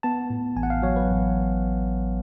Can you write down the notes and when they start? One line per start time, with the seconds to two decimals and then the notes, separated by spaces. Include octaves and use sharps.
0.03 B3 A5
0.30 A2
0.56 A1 G#5
0.63 F#5
0.70 F5
0.82 F#3 C#5
0.96 B4
1.10 A1